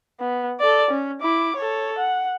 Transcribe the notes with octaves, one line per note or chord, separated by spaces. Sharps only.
B3
A4 D5
C#4
E4 D6
A4 C#5
F#5